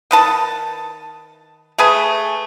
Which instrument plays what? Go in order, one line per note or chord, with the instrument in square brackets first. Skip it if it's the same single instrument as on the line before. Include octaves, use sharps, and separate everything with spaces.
[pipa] D#3 B4 A5
A3 G#4 B4 G#5